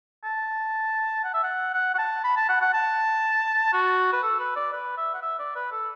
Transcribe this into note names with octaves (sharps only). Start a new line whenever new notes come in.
A5
F#5
E5
F#5
F#5
F#5
A5
B5
A5
F#5
F#5
A5
F#4
B4
A4
B4
D5
B4
E5
F#5
E5
D5
B4
A4